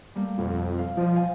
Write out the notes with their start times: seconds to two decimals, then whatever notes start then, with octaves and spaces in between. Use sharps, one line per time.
0.15 G3 A3 A#3
0.38 F2 B2
0.78 F5
0.97 F3 D5 D#5
1.16 D5 F5 G#5